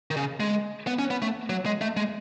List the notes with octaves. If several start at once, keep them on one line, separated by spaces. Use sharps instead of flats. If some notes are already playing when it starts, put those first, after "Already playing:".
D#3
C#3
G#3
B3
C#4
B3
A3
F#3
G#3
A3
G#3